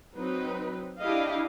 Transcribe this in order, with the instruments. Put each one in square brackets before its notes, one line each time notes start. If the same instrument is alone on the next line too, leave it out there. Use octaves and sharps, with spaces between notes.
[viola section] F#3 C4 D#4 B4
D4 E4 G4 D#5 F5